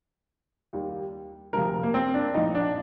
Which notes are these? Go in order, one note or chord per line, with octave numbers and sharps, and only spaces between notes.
D#2 D#3 G3
D2 C3 F3 A#4
A#3
C4
D4
A#1 A2 F3 D#4
D4